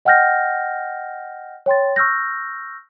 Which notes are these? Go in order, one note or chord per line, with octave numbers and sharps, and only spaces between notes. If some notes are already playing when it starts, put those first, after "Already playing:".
D#5 F#5 G5 F6 G6 A#6
C#5 G5 C6 A6
C#6 E6 F6 G6 A#6